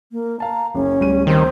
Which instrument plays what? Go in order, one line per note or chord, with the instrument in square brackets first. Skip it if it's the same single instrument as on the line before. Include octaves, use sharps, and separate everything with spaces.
[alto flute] A#3
[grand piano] F5 A5 [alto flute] A#5
[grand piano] F#1 [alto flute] C#4
[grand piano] D1 G3 D#7
[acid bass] D#3 [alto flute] C4